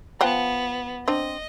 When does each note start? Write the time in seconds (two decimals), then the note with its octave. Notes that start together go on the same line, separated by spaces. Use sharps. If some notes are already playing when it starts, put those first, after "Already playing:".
0.21 F3 B3 F#5 G5
1.08 C4 D4 D#5